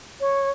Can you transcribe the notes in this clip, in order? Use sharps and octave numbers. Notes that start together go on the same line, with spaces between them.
C#5